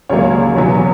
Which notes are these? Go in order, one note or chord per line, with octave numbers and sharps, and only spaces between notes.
C#2 C#3 F#3 A#3 C#5
E2 B2 F#3 B3